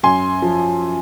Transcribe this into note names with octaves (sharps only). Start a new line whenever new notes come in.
F#2 G#5 C6
F3